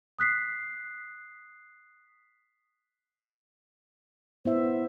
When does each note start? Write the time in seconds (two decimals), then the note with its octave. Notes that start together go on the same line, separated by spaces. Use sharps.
0.19 D#6 F#6 B6 C7
4.45 B3 E4 C5 E5